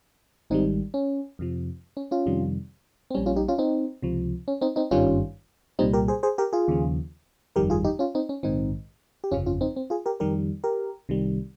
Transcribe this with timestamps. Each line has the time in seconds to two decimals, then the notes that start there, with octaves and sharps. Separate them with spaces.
0.50 G#1 G#2 D#3 G3 C4 D#4
0.94 C#4
1.39 F2 C3 F3
1.97 C#4
2.11 C#4 F4
2.26 F2 C3 D#3 G3
3.11 C4
3.14 A#1 A#2 G3 C#4
3.26 C#4 F4
3.36 D#4 G4
3.48 C#4 F4
3.58 C4 D#4
4.02 C#2 C3 F3
4.48 C#4
4.61 C4 D#4
4.76 C4 D#4
4.91 G#1 G2 D#3 G3 C#4 F4
5.79 C2 A#2 G3 C4 D#4
5.93 G4 A#4
6.08 G#4 C5
6.23 G#4 C5
6.38 G4 A#4
6.53 F4 G#4
6.68 D#2 C#3 F3
7.56 G1 F2 D#3 G3 G4 A#4
7.70 F4 G#4
7.84 D#4 G4
7.99 C#4 F4
8.15 C4 D#4
8.29 C#4
8.43 A#1 G#2 D#3 C4 D#4
9.24 G4
9.31 G1 F2 C#3 F3 C#4 F4
9.46 C#4 F4
9.61 C4 D#4
9.76 C4
9.90 F4 G#4
10.06 G4 A#4
10.20 F2 D#3 G3 G4 A#4
10.64 G4 A#4
11.09 C2 C3 D#3 G3